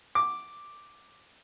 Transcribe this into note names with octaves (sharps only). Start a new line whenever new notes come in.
D6